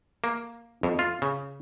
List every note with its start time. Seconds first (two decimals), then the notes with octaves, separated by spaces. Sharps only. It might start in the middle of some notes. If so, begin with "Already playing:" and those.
0.24 A#3
0.83 F2
0.99 F4
1.22 C#3